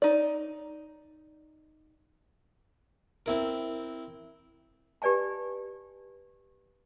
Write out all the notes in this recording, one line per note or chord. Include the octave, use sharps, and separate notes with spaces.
D#4 D5
C4 E4 A#4
G4 B4 D5 G#5 A5